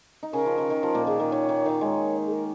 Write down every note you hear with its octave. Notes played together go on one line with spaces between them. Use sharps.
D#4
C#3 C#4 A#4
F3
D#3
D#3
F3
A#2 A#3
D#3 G#4
D#3 A#4
D#3 C#5
D#3
D#3
G#3 C#5
G#4
A#4